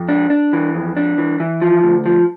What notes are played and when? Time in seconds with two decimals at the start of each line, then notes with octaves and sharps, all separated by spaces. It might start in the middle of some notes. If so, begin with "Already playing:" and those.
Already playing: F2
0.08 D4
0.30 D4
0.53 E3
0.74 F2
0.97 D4
1.18 E3
1.40 E3
1.62 F3
1.84 D2
2.06 F3